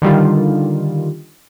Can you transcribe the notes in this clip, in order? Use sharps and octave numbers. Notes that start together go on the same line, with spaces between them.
D3 D#3 G3 F4